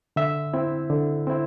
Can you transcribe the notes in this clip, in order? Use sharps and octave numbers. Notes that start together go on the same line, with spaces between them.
D3 E5
C4 E4
D3
C4 E4